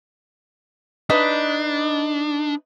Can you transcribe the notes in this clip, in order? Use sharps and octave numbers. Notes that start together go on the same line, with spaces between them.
D4 D#4 B4 D#5